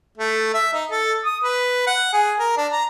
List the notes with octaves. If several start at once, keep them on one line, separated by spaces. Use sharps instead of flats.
A3
E5
D#4
A4
D#6
B4
F#5
G#4
A#4
D4
A#5